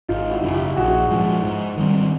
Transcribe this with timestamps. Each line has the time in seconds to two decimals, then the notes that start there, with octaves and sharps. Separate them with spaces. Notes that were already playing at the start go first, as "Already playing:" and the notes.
0.09 G#1 D#4 F4
0.31 E4 F#4
0.43 F#2 C#3
0.54 F4 G4
0.76 A#1 F#4 G#4
1.10 G#2 F3
1.43 G#2
1.77 D#3 G3 C4